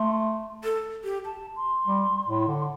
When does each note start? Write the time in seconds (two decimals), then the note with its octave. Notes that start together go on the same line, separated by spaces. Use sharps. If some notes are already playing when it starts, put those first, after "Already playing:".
Already playing: A3 C6
0.64 A4
1.04 G4
1.25 A5
1.56 C6
1.87 G3
2.27 A2
2.48 D3